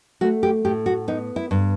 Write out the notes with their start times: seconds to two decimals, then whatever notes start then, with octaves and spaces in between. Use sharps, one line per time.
0.21 A3 F#4
0.43 G4
0.65 A2 G4
0.86 F#4
1.08 B3 D#4
1.36 E4
1.51 G2